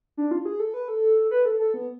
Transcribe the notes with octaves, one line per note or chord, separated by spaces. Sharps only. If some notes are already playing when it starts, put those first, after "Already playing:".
D4
F4
G#4
A4
B4
A4
B4
A4
A4
B3